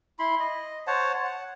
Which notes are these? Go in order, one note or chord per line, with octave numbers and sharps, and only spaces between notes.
E4 B5 C6
D#5
C5 C#5 F#5 A5
F#5